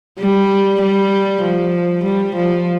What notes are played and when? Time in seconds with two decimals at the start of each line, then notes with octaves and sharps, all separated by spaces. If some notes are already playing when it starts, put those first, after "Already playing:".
0.19 G3
0.81 G3
1.43 F3
2.04 G3
2.35 F3